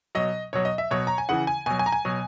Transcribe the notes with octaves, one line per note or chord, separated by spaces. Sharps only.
B2 F#3 D#5
B2 F#3 C#5
D#5
E5
B2 F#3 C#5
A#5
G#5
C#3 E3 F#5
G#5
B2 F#3 G#5
G#5
A#5
G#5
B2 F#3